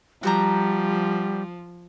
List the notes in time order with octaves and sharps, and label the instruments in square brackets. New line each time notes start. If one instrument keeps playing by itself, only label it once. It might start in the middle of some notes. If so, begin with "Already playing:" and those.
[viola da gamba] F3 [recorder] G3 [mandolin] F#4 C5 A#5